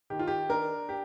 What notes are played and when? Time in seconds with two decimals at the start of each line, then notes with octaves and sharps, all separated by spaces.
0.10 D#3 G4
0.19 F4
0.28 G4
0.49 D4 A#4
0.89 G4